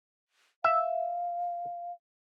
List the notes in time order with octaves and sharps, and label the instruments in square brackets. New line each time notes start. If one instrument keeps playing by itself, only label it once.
[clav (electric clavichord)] E5 [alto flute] F5